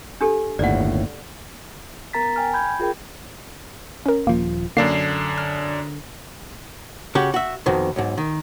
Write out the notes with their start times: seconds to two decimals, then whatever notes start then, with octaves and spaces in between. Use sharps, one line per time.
0.21 D4 G4 A4
0.59 G1 D#2 A2 D5 F#5
2.13 B3 A#4 A#5 A6 B6
2.36 G5 G#5 F6
2.54 B5 G6 G#6
2.80 F4 G#4 A#4 G5
4.06 C#4 A#4
4.27 D#1 F3 A#3
4.77 F#2 D3 A#3 D4 C7
5.38 F6
7.15 C#3 F#4 G4
7.34 F#4 E5
7.66 F2 B2 D#3
7.96 B1 G#2
8.17 D#3